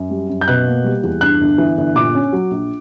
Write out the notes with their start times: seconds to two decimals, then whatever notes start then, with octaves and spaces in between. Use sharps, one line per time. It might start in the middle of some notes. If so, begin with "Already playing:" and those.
Already playing: F#2
0.10 G3
0.29 F#2
0.41 G6
0.48 B2 F#6
0.67 A#3
0.84 G3
1.03 E2
1.21 G2 F#6
1.41 G1
1.58 E3
1.77 G1
1.95 A#2 D6
2.15 C#4
2.33 F#3
2.51 A#1